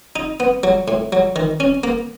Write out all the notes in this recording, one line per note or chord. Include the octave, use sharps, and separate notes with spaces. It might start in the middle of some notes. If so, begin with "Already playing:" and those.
D#4
B3
F#3
A2
F#3
D#3
C#4
A#3